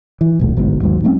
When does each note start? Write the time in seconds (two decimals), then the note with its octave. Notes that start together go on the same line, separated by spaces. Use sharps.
0.21 E3
0.39 D#1 B1 A3
0.57 G1 G#2 B2
0.81 D#2 G#2 F#3
1.04 F#3 A3 C4 C#4